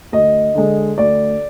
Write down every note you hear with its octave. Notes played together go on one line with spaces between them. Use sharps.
D2 D#5
D3 G#3
D2 D5